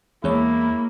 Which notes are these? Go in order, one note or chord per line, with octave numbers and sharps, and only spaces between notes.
E2 G#3 A#3 E4 C#5